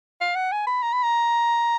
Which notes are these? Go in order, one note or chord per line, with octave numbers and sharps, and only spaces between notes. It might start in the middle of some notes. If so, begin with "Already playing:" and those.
F5
F#5
G#5
B5
A#5
B5
A#5